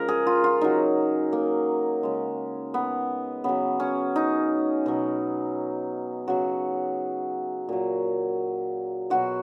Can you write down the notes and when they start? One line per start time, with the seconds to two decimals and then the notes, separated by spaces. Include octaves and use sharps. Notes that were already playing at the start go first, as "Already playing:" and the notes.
Already playing: C#3 F3 G#3 A#4
0.08 G#4
0.27 F4
0.44 F4
0.61 C#3 F#3 D#4
1.32 A#3
2.03 C#3 G#3
2.74 B3
3.44 C#3 F#3 B3
3.80 C#4
4.16 D#4
4.86 B2 F#3
6.28 C#3 F#3 F#4
7.69 A#2 F#3
9.10 B2 F#3 F#4